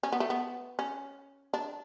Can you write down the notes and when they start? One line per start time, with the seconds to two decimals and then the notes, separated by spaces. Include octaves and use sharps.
0.03 C#4
0.12 B3
0.20 A3
0.30 B3
0.79 C#4
1.54 D4